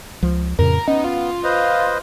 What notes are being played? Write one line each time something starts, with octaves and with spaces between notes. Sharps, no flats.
C#2 F3
F2 A2 C#3 A#4
B3 C#4 D#4
F4
B4 C5 D#5